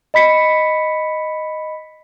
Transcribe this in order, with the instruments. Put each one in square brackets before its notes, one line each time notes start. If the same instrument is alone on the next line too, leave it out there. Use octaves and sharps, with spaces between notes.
[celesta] D#5 B5 B6 C#7